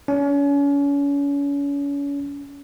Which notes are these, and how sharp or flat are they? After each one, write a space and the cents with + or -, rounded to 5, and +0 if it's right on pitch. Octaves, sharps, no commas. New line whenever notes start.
C#4 +35